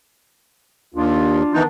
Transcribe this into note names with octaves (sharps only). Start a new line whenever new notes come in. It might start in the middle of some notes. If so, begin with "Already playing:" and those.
D#2 D4 F4
D#3 E3 B3 D4 D#4